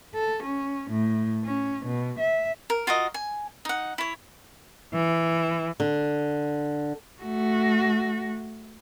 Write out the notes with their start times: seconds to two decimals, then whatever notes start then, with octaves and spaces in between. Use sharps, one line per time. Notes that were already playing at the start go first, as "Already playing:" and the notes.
0.15 A4
0.43 C#4
0.91 A2
1.44 C#4
1.86 B2
2.19 E5
2.70 A#4
2.87 F4 F#4 A#4 D#5
3.14 G#5
3.65 D#4 F#5
3.98 E4 C#5
4.93 E3
5.80 D3
7.22 A3 F#4